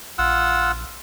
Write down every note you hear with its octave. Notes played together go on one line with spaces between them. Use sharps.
A#1 F4 F#5 E6